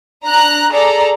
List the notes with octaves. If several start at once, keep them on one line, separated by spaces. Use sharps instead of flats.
D4 A#5 F#6
G#4 A4 D5 A#5